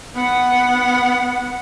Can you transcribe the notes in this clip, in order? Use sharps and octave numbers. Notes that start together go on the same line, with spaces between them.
B3 F#5